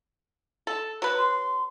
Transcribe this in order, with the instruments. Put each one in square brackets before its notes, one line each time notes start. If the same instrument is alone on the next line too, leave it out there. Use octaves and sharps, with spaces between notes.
[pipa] A4
F#3 B4
[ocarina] C6